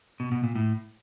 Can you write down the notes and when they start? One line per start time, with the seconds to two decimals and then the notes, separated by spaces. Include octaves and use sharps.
0.20 B2
0.32 B2
0.44 A#2
0.56 A2